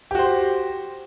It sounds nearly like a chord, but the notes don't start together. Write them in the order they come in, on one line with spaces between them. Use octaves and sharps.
G4 F#4 C5